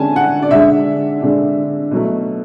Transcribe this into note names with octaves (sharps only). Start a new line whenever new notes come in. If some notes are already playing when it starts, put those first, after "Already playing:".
Already playing: D3 G#3 C#4 G#5 A5
F#5
D5
D3 G#3 D4 E5
D3 G#3 D4
B2 F#3 A3